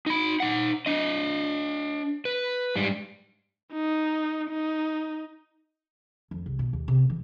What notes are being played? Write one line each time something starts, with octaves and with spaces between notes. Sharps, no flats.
D#4 B5
D#4 F#5
D4 D#5
B4
G#2 G3
D#4
D#4
F2
C2
B2
D#2
C3
E3